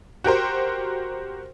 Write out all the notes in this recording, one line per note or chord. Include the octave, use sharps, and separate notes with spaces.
F#4 G4 A#4 C5